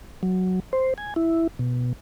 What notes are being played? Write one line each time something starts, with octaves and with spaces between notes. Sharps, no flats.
F#3
C5
G#5
E4
B2